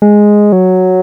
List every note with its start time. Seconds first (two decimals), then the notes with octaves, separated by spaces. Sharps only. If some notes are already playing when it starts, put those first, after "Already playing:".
0.02 G#3
0.52 F#3